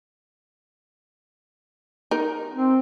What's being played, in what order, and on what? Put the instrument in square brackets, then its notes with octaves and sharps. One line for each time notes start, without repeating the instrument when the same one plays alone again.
[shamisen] D#4 A#4
[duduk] C4